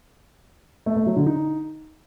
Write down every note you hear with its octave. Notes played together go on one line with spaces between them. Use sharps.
A3
A3
F#3
D3
D#4